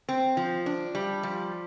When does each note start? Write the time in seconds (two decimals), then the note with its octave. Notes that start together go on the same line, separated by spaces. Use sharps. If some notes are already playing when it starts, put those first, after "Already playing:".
0.09 C4
0.37 F3
0.66 D4
0.95 G3
1.23 F3